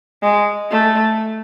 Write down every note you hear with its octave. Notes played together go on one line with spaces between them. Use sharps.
G#3
A3